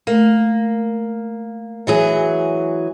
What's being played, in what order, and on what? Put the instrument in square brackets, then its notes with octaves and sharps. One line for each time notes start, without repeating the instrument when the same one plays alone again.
[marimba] A3 [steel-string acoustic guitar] A#3
[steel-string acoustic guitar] E3 F#3 G#4